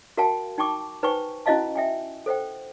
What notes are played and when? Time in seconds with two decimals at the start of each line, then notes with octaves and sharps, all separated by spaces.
0.17 F#4 A#4 F5 G5 A5
0.58 D#4 G5 A5 C#6 D6
1.03 D#4 B4 C5 G5 G#5 C#6
1.46 C#4 E4 F#4 D#5 F5 A5
1.76 E5 G5 G#5
2.26 A4 C5 F#5 G5